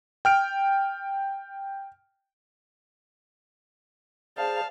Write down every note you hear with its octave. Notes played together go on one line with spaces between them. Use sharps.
G5 F6 D7
G#4 C5 D5 F5 A5